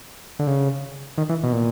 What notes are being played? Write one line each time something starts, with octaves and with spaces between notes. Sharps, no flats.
D3
C#3
D#3
E3
B2
A#2